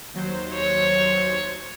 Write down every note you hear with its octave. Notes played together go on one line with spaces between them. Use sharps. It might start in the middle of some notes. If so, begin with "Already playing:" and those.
D#2 F#3 C5
C#5